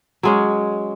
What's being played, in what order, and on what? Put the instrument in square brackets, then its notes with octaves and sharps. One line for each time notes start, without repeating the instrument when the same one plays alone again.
[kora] F#3 G#3 C#4